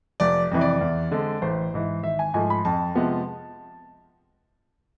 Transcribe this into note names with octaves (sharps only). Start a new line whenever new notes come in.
F1 D5
F2 C3 E3
D5
E2
D3 G#3 C4
A1 C5
G#2 E3
G#1 E5
G#5
G#2 F3 A3 G#5
B5
F2 A5
C3 F3 G#3 B3